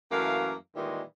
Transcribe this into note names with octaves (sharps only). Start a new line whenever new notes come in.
F#2 E3 A3 A#3 F5
A#2 D#3 E3 G3 G#3